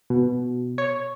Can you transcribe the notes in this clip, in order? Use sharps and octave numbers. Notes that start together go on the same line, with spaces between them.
B2
C#5